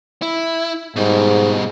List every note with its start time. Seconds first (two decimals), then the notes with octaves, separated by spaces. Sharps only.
0.22 E4
0.96 G#2 B2 G3